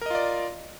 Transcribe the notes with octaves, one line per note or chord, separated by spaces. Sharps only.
F4 A#4 D5 D#5